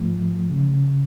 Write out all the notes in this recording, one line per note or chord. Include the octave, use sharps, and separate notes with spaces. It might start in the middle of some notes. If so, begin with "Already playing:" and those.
Already playing: G#2 F3 A3
C#3